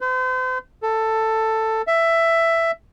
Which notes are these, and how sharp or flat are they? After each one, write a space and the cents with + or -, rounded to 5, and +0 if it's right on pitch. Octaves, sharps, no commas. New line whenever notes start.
C5 -40
A4 +10
E5 +10